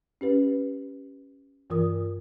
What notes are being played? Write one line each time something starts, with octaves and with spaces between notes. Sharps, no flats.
C#4 G4 B4
G2 E3 F4 A#4 D#6